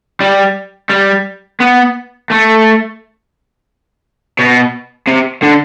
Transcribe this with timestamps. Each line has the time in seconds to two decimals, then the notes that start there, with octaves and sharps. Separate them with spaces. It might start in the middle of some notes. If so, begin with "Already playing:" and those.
0.20 G3
0.90 G3
1.60 B3
2.30 A3
4.39 B2
5.07 C3
5.43 D3